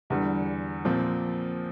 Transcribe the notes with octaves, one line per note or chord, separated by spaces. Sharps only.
E2 D3 G3
A#2 F3 C4